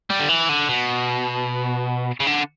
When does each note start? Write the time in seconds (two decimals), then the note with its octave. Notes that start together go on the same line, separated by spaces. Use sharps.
0.10 G3
0.19 D3
0.29 E3
0.49 D3
0.69 B2
2.20 C#3
2.27 D3